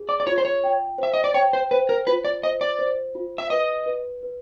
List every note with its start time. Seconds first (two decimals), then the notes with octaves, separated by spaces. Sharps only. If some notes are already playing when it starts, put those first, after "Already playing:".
Already playing: G#4
0.09 D5
0.20 D5
0.27 F4 C#5
0.38 C5
0.45 C#5
0.64 G5
0.98 C5 E5
1.14 D#5
1.24 D5
1.34 C#5 G5
1.53 C5
1.71 B4 C5
1.89 A#4
2.07 F4 B4
2.25 D5
2.43 C5 D#5
2.61 D5
2.79 C5
3.15 F4
3.38 E5
3.50 B4 D#5
3.86 B4
4.23 B4